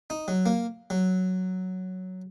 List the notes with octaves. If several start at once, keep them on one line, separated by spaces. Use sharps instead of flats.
D#4
F#3
A#3
F#3